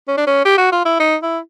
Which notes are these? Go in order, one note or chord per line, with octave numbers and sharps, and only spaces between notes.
C#4
D4
C#4
G4
F#4
F4
E4
D#4
E4